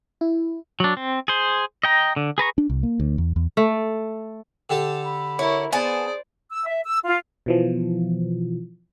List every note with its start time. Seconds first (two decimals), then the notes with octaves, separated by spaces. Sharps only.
0.21 E4
0.80 F#3 D4
0.97 C4
1.28 G#4 C5
1.83 D#5 G5 A#5
2.16 D3
2.38 G#4 B4 A#5 C#6
2.58 D4
2.70 C2
2.83 A#3
3.00 D2
3.18 E2
3.36 E2
3.57 A3
4.70 D3 G4 A4
5.05 B5
5.39 E4 A#4 C#5
5.72 B3 G#4 C5 D5 G#5 A5
6.50 E6
6.66 E5
6.85 E6
7.05 F4
7.46 B2 E3 F3